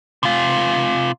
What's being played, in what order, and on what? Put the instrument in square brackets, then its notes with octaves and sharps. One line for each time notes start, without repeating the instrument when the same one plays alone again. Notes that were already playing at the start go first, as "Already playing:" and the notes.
[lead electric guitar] C3 F4